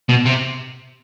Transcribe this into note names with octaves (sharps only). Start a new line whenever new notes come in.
B2
C3